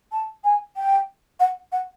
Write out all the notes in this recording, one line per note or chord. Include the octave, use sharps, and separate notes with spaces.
A5
G#5
G5
F#5
F#5